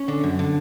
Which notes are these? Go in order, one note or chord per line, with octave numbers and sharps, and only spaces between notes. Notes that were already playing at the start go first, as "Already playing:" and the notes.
Already playing: C#4
D3
F#2
D3